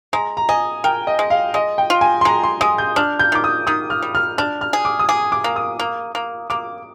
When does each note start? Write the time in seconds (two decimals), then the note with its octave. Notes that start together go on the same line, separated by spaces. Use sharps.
0.13 G#3 A#5
0.37 A#5
0.49 D#5 G#5
0.84 A#4 G5
1.07 D#5
1.19 G#3
1.30 F5
1.54 G#3 D#5
1.78 G5
1.90 F4
2.01 G#5
2.21 C6
2.25 G#3 A#5
2.43 C6
2.61 G#3 D#6
2.78 G6
2.96 D4 F6
3.19 G6
3.32 D#3 D6
3.44 D#6
3.67 D#3 D#6
3.90 F6
4.02 G3
4.15 F6
4.38 D4 F6
4.61 F6
4.73 G#4
4.85 D6
4.99 D#6
5.09 G#4 D6
5.32 D6
5.44 A#3
5.56 D#6
5.79 A#3
6.15 A#3
6.50 A#3 D6